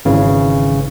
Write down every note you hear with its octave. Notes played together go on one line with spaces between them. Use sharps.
G#1 C#3 E3